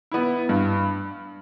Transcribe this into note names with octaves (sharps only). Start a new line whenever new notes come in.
B3 E4
G2